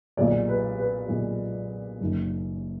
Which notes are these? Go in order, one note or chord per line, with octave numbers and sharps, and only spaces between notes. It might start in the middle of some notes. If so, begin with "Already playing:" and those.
B1 A#2 G#3 D5
B4
B4
B1 A#2 G#3
F#1 F#2 D#3